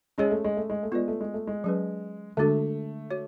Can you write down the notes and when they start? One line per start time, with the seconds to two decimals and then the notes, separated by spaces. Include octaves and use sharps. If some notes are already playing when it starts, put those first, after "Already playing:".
0.18 G#3 C#4 G#4 C#5
0.31 A3
0.44 G#3
0.57 A3
0.70 G#3
0.83 A3
0.92 G#3 B3 F4 B4 D5
1.08 A3
1.21 G#3
1.34 A3
1.47 G#3
1.64 F#3 C#4 G#4 B4
2.37 D3 G#3 A3 D4 F#4 A4
3.11 F#4 C#5